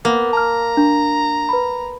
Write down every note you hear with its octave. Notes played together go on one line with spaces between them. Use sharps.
A#3 B3
A5 A#5 F6
D4
B4 B5